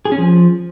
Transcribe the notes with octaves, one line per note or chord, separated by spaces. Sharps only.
G#4
C#4
F3